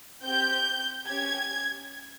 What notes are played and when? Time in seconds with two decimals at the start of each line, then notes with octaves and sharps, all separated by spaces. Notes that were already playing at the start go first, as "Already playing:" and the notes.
0.24 C4 G4 G6
1.06 C#4 G4 G#6